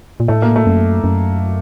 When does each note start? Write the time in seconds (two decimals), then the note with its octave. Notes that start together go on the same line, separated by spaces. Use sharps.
0.20 A#2
0.28 A2 A3
0.42 A#3
0.56 A3
0.66 F#2
1.04 F#2